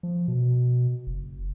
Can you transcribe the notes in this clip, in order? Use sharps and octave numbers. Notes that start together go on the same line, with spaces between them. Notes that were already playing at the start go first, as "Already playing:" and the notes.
F3
B2
F#1